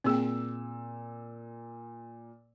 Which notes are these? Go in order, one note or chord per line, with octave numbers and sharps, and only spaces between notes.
A#2 C4 G#4 G5 E6